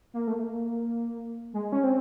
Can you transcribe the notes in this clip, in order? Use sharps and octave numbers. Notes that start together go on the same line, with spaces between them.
A#3
A3
A#3
G#3
C#4
C4